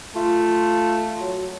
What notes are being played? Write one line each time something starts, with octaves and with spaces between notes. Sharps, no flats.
A3 F4
F#3